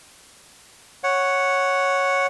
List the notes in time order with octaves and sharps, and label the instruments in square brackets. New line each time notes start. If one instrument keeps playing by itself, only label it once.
[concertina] C#5 F#5